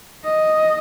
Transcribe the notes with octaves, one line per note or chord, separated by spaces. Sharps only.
D#5